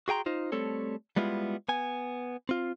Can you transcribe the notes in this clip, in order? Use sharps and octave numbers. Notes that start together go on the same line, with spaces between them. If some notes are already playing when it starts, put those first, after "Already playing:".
F#4 G#4 G5 A#5 C6
D#4 F4 C5
G3 A3 C4 A4 C#5
G3 G#3 B3 E4 F4
B3 G#5
C4 F4